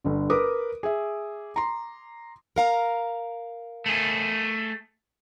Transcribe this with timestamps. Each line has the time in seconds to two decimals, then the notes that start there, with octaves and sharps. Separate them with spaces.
0.04 G1 D3
0.30 A#4 B4 D6 D#6
0.83 G#4 E5
1.56 A#5 C6
2.56 A#4 F5 A#5
3.86 A3 G#4